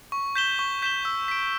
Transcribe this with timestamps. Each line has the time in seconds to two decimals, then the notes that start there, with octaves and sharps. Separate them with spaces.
0.12 C#6
0.35 G6 B6 E7 G7
0.59 C#6
0.82 G6 B6 E7 G7
1.05 E6
1.28 B6 D7